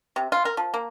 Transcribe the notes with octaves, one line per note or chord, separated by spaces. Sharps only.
C3
F4
A#4
F3
A#3